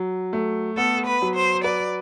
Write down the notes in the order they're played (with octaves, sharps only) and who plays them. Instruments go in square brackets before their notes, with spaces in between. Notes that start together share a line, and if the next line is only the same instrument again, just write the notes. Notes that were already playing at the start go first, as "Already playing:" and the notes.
Already playing: [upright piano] F#3
A3
[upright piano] B3 [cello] A4
[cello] B4
[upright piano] F#3
[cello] C5
[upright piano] B4 [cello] D5